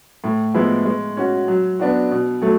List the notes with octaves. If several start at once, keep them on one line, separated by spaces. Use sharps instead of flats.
A2
F3 G#3 B3 E4
G#3
C#4 F#4
F#3
B3 D4 F#4
B2
F#3 A3